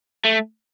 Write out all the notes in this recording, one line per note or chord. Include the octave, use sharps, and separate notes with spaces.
A3